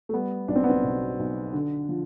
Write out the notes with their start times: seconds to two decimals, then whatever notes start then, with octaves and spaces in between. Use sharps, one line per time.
0.09 A3
0.13 G3 B3
0.48 B1 D4
0.56 C4
0.64 B3
0.70 C4
0.84 B2
1.19 B1
1.53 D3
1.89 F3